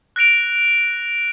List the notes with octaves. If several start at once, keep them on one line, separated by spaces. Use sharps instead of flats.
F#6 A#6 D7 F7